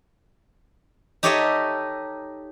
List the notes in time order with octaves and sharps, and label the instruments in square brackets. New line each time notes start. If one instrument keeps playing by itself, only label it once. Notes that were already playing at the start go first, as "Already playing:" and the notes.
[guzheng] D#4 G4 A4 C#5 D#5 E5